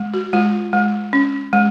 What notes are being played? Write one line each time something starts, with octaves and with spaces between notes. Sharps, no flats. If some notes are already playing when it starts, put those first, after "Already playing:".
Already playing: G#3
F#4
G#3 F4
G#3
C#4
G#3